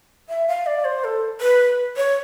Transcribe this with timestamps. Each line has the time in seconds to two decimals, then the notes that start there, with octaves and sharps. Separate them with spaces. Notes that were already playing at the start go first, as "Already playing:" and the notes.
0.29 E5
0.48 F5
0.66 D5
0.85 C5
1.04 A4
1.41 B4
1.97 C#5